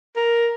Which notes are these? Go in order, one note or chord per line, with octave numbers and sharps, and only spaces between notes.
A#4